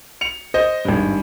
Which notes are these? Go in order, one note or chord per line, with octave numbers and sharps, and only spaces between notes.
C#7 F7
C5 D#5
G#1 G2